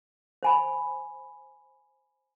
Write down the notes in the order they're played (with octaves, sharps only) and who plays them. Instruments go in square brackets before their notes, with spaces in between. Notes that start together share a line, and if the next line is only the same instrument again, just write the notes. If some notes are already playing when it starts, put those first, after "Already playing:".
[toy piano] C5 G#5 B5